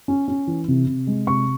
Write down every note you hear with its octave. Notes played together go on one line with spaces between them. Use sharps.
C#4
C#4
E3
C3
C3
G#3
C3 C#6